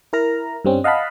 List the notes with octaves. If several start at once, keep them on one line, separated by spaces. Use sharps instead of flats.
E4 A#4 A#5
G2 G3 C4 C#4
D#5 F5 F#5 A5 B5